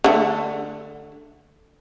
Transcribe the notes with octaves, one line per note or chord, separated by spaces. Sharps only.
D3 A3